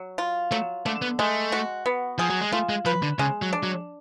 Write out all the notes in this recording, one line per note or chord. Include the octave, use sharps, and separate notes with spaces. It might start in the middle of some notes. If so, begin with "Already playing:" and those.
Already playing: F#3
F4
F#3 A3
D3 A3
B3
G#3 A3
F#4
B3
F3 G#4
F#3
G#3
A3 F4
G#3
F3 B4
D3
C#3 G#3
F#3
D4
F#3